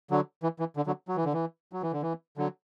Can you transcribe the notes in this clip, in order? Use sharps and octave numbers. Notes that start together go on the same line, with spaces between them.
D3 F#3
E3
E3
D3
D3 F#3
F#3
E3
D3
E3
F#3
E3
D3
E3
D3 F#3